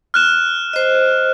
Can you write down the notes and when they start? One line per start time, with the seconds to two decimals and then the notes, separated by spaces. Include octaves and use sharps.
0.14 F6 F#6 E7
0.73 C5 D#5